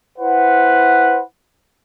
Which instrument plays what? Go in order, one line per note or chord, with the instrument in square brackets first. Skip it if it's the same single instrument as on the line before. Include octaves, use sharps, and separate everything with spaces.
[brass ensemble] E4 B4 C5 F#5